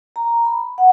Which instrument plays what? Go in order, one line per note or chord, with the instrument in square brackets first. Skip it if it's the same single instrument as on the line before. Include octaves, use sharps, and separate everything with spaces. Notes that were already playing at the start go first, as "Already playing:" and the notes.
[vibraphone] A#5
B5
F#5